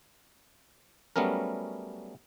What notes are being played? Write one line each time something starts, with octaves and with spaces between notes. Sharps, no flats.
F#3 G3 A3 B3 C#4 A#4